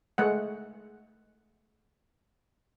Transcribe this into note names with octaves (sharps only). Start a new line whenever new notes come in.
G#3 A3 F#5